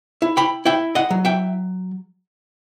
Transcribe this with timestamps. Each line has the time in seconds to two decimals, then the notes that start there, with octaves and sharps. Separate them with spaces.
0.22 E4
0.37 G5 B5
0.65 E4 E5 G5
0.95 D#5 F#5
1.10 F#3
1.25 E5 G5